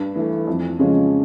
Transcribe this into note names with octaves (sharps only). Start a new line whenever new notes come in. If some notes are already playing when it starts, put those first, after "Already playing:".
Already playing: G2
E3 A3
F2
C#3 F3 G#3 C#4